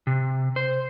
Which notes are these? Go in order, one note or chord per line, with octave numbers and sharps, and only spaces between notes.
C3
C5